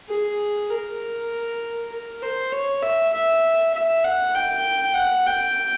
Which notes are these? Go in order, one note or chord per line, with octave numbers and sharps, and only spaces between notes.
G#4
A#4
A#4
C5
C#5
E5
E5
E5
F#5
G5
F#5
G5